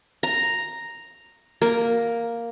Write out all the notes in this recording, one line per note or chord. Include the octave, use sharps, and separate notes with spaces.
A#5
A#3